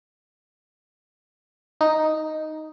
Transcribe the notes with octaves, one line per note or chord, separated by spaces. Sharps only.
D#4